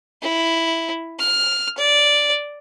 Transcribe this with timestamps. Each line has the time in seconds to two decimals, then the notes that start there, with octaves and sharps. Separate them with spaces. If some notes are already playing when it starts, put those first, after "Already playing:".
0.22 E4
1.19 F6
1.78 D5